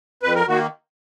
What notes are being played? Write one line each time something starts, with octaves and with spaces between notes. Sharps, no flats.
F2 B4
A#4
D#3 A#3 F#4